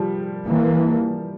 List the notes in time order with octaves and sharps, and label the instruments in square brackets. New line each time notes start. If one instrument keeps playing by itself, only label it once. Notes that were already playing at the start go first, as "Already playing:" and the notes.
Already playing: [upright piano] F3 G3
[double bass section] E3 A#3